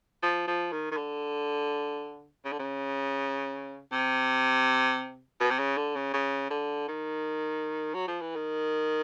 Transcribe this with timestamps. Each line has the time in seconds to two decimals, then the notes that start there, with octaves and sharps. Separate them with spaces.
0.23 F3
0.47 F3
0.72 D#3
0.91 D#3
0.97 D3
2.45 C#3
2.52 D3
2.59 C#3
3.92 C3
5.40 B2
5.50 C3
5.59 C#3
5.77 D3
5.96 C#3
6.13 C#3
6.50 D3
6.88 D#3
7.94 F#3
8.08 F3
8.21 E3
8.36 D#3